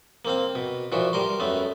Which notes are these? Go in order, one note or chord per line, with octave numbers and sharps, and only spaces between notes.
A#3 C4 F5
B2
A#2 E3 F3 F#4
G3 A#4 C6
F#2 A3 B3